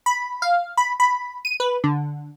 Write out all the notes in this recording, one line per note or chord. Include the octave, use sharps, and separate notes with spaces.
B5
F5
B5
B5
D#7
B4
D3